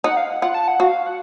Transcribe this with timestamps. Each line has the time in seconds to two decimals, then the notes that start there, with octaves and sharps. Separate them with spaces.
0.04 D#4 F#5
0.17 F5
0.30 F#5
0.42 F4 F#5
0.54 A5
0.68 F#5
0.80 F#4 F5
1.07 F#5